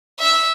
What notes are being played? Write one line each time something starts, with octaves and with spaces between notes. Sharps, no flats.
E5